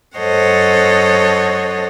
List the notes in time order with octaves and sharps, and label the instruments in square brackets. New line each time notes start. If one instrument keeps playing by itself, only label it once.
[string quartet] F#2 A4 C5 C#5 D#5 F#5